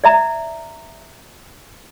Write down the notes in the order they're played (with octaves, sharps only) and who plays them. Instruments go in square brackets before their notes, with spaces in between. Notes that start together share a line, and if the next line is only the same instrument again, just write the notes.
[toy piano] D5 E5 A#5